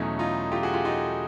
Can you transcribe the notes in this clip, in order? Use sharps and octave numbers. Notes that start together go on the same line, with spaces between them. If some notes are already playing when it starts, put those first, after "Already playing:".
Already playing: E2 B2 F#3 A3 C#4 D#4
D#4 F4
F4 G4
F#4 G#4
F4 G4
D#4 F4